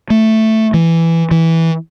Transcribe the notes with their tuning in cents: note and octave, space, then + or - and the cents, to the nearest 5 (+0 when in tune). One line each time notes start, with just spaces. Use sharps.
A3 +5
E3 +5
E3 -10